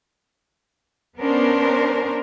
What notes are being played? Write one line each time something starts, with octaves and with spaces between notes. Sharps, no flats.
B3 C#4 D4 A#4 C5